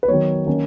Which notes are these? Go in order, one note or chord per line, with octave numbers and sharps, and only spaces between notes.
B4
D#3 F#3 B3 C#5
D#3 A#3 C#4